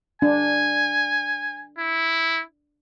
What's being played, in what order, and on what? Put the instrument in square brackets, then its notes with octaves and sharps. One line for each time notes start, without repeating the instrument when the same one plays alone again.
[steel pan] D4 [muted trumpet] G#5
[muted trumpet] E4